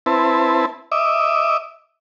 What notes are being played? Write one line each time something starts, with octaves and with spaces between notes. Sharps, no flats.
C4 E4 B4 A5
D#5 E5 D6